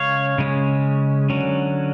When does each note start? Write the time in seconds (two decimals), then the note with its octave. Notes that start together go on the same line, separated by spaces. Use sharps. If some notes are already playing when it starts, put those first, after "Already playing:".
Already playing: C#3 G#3 C#4 C#5 F5
0.38 C#3 G#3 C#4
1.30 D3 F#3 C#4